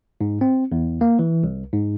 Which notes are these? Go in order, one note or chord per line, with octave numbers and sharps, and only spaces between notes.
G#2
C4
E2
A#3
E3
C2
G#2